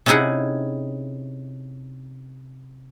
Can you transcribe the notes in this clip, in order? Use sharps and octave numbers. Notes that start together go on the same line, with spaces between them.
C3 C#4 D#4 E4 G#4 F#5